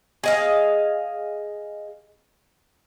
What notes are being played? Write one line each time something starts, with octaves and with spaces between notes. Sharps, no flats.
G#4 D#5 F5